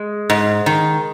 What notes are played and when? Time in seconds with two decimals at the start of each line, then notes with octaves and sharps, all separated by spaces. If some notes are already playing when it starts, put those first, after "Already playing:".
Already playing: G#3
0.30 G#2
0.66 D#3